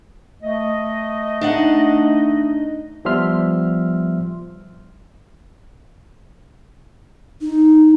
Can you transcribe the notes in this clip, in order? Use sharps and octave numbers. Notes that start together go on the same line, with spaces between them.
A3 D#5
D4 D#4 F#5
F3 G3 B3 E5 C6 F6
D#4